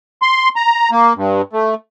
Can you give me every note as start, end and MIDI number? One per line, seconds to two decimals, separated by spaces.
0.22 0.49 84
0.56 0.90 82
0.91 1.13 58
1.16 1.42 43
1.53 1.74 57